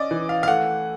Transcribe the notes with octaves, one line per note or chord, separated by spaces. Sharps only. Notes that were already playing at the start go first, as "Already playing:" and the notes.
Already playing: C#4 D5 D#5
E3
F5
F5
A3 F#5